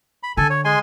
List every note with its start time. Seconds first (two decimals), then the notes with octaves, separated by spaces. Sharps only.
0.23 B5
0.37 D3 A4 G#5
0.50 C#5
0.65 G#3 G#5 C6